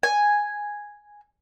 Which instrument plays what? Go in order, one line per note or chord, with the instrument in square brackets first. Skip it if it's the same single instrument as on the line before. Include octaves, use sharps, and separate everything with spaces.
[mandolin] G#5